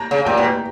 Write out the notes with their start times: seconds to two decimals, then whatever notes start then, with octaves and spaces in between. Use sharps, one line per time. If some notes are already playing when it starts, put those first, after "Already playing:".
Already playing: A#5
0.11 C#3
0.25 A#2 G5
0.38 B2